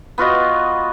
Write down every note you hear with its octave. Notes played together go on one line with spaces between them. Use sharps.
B3 F4 F#4 D#5